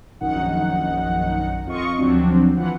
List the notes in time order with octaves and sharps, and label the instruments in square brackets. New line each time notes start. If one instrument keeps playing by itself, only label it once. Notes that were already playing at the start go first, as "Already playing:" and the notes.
[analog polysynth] A#1 F#2 D#3 D#4 F#5
F2 F4 D#5 C#6
D2 F3 F#3 C4 D4
E3 F3 F#5